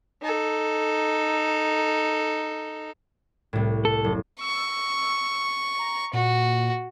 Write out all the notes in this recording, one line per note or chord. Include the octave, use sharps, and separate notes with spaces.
D#4 A4
C2 A2
A4
F#1
C#6 E6
A#5
A#2 F#4